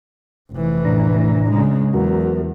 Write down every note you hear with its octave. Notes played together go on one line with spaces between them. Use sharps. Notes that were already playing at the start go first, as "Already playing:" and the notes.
F1 E3
A2 D4 A#5
C#3 G#3
E2 F#3 F#4 A#4